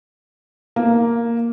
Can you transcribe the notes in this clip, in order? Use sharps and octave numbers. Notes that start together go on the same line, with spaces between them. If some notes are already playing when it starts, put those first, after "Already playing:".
A#3